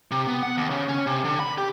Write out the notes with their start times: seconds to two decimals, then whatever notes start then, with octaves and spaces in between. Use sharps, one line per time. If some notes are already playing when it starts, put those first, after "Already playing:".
0.11 C3
0.27 B3
0.43 F#5
0.57 D#2
0.70 C#3
0.89 C#4
1.07 C3
1.24 D3
1.40 B5
1.58 G4